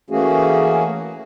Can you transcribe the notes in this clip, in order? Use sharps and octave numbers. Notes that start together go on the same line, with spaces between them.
E3 A3 A#3 C#4 F#4 G#4